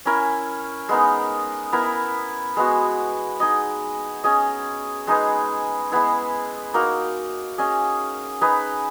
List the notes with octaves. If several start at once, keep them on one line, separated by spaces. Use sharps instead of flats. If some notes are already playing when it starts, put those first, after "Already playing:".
C#4 E4 A#4
G#3 B3 D#4 A#4
B3 E4 A#4
G#3 B3 F#4
D#4 G#4 D#5
C#4 G#4 D#5
G#3 D#4 G#4 B4
G#3 B3 E4
A#3 D#4 F#4 A#4
C#4 G#4 D#5
D#4 G#4 B4 D#5